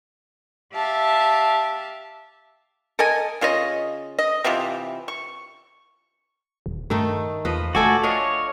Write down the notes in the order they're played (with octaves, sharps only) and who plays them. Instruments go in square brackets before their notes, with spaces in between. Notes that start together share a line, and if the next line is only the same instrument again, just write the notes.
[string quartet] G4 E5 F5 A5
[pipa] A4 A#4 D#5 G#5
C#3 F4 C#5 D#5
D#5
C3 E3 F4 G4
C#6
[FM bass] D#1
[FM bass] G2 [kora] D#3 A3 D#4
[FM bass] E2 [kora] F3 B4 D#5
[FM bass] F1 [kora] A3 A4 D5 [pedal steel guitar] F#4 G#5
[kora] D4 F4 D#5 [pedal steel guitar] C#5